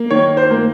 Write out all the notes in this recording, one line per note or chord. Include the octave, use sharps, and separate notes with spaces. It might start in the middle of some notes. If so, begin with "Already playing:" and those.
Already playing: A#3
D#3 C#5
C5
A#3